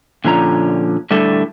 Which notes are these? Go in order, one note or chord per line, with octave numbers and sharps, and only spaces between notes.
A#2 D3 F3 C#4 A#5
A2 D3 G3 A3 A4